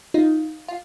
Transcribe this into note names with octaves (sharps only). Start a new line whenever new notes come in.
D#4 F4
F4